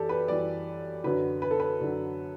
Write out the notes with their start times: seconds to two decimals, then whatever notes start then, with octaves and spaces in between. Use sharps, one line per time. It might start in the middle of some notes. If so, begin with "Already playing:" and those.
Already playing: F#2 E3 G4 A4 D5
0.09 B4
0.28 F#2 E3 G3 D5
1.04 F#2 D3 F#3 B4
1.42 B4
1.51 A4
1.60 B4
1.80 F#2 D3 F#3